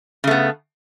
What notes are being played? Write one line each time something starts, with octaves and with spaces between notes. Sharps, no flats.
C#3 A3 B3